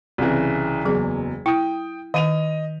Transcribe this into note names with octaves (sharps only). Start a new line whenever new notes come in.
C2 C#3 E3
F#1 E2 F#3 G#4
E4 G5 D#6
D#3 D#5 D#7 F7